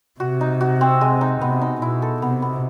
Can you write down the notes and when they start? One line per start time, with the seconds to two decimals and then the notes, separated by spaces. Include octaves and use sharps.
0.20 C3 F#4
0.41 D#4
0.61 F#4
0.81 C4
1.01 G#3
1.21 D#4
1.41 C3 B3
1.61 D#4
1.82 B2 E4
2.02 A4
2.22 C3 B3
2.42 B3